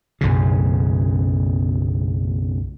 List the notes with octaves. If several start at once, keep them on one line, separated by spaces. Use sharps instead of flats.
B1 F#2 A2 C#3